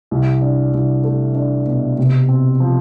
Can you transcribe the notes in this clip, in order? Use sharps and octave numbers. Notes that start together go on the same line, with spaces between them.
C2
D4
C2
A3
D4
B2
C3
C4
F3